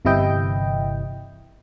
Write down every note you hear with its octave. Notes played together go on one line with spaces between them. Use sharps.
G1 C3 E3 E4 D#5 G5